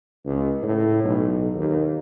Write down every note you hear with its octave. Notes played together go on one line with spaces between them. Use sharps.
C#2
A2
B1
D#2